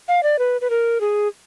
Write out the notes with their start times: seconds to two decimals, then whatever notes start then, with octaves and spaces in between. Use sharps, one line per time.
0.08 F5
0.23 D5
0.39 B4
0.61 B4
0.70 A#4
1.01 G#4